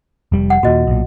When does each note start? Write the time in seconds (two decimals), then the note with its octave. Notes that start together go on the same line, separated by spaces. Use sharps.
0.32 F1 G3
0.50 F#5
0.63 D#2 A#2 F#4 D#5
0.87 B1 A#2